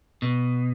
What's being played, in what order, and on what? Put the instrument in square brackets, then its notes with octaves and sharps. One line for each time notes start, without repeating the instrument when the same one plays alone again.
[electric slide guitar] B2